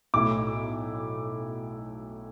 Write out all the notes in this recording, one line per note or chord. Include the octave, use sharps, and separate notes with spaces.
B1 A2 A3 E4 D6